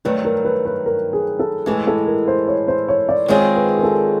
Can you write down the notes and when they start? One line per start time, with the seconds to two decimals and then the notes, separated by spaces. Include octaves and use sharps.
0.05 G2 D#3 F#3 A3 B4
0.25 A#4
0.45 B4
0.65 B4
0.86 A#4
1.13 G#4
1.39 A4
1.66 A2 E3 G#3 A4
1.87 A4
2.07 A#4
2.28 C5
2.48 C#5
2.68 C5
2.88 C#5
3.09 D5
3.28 D#3 G#3 C4 F4 G#4 C#5
3.56 B4
3.77 A#4
3.83 A4